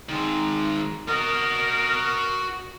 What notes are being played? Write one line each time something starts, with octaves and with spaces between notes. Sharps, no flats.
D#3 G#3
F#4 A#4 D#5